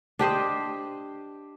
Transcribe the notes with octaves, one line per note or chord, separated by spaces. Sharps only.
D4 G4 C5 D#5